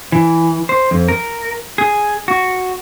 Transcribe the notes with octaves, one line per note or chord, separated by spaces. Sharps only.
E3
C5
F2
A#4
G#4
F#4